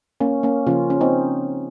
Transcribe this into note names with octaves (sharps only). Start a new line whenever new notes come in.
A#3 C#4
A#3 C#4
C#3 F3 A#3 C#4 F4
C#4
C4 D#4